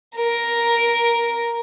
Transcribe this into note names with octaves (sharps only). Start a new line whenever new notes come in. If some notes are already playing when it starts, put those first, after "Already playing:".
A#4